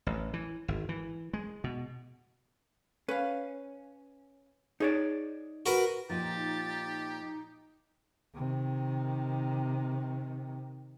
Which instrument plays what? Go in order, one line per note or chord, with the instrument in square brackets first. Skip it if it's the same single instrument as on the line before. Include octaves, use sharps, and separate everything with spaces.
[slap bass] A1
E3
G#1
E3
G#3
B2
[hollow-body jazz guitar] C#4 [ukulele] B4 F5
[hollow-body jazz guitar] D#4 C#5 D5 [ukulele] G#4
[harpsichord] F#4 A#4 B4
[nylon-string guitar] A#2 F3 [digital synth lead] D#4 [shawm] G4 [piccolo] A6
[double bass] C3 D#3